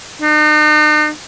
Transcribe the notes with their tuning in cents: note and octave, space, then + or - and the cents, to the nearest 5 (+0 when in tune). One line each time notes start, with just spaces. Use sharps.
D#4 -45